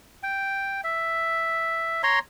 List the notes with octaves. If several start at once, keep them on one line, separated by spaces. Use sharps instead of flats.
G5
E5
C#5 A#5 C6